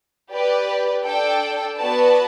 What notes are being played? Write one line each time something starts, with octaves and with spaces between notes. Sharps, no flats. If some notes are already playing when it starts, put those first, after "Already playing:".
G4 B4 D5
D4 A4 D5 G5
B3 F#4 B4 D5 A5